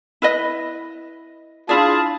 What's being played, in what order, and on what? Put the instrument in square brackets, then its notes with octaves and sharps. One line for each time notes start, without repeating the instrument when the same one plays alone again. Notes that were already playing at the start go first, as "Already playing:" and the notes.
[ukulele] E4 B4 D#5
[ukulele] D4 E4 D5 [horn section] F4 G#4 A5